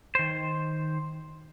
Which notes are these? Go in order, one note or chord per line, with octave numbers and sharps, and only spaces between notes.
D#3 C5